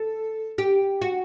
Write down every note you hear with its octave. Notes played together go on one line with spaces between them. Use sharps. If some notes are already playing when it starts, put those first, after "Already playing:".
Already playing: A4
G4
F#4